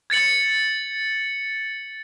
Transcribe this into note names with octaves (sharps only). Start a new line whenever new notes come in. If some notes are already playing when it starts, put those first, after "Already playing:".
G#6 A6 C#7 F#7